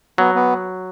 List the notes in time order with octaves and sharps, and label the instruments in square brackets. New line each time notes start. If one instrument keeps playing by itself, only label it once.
[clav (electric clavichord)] F#3 [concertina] B3
[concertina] B3